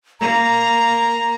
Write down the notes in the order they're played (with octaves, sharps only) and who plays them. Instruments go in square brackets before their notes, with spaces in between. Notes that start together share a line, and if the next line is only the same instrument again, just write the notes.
[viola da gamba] A#3 [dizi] A#5